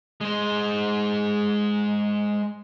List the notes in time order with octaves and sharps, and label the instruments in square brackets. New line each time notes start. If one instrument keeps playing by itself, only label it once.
[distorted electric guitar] G#3 C5